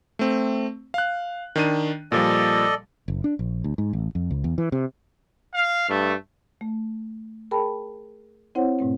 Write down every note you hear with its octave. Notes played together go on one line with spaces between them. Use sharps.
A3 C4
F5 F#6
D#3 D4 D#7
A#2 F3 G3 A4 D5 D#5
F#1
D4
A#1
D2
G#2
A1
F2
C#2
E2
E3
C3
F5
G2 A3
A3
G#4 A#4 G5 A5 B5
C4 E4 C5 C#5 F#5
G#2 B2 A3 C4